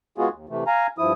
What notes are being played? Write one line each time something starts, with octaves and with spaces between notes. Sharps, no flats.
G#3 B3 F4 F#4 G#4
D#2
C3 E3 A3
F5 G#5 A#5
G2 F3 E4 D#6